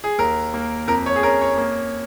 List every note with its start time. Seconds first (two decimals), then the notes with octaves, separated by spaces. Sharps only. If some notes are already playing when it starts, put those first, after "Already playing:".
0.04 G#4
0.19 D#2 A#4
0.54 A#3
0.88 F2 A#4
1.06 C#5
1.16 G#4
1.23 C#4 A#4
1.41 C#5
1.58 A#3